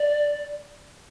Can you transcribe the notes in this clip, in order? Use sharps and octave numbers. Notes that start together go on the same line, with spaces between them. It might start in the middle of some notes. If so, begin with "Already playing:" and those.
Already playing: D5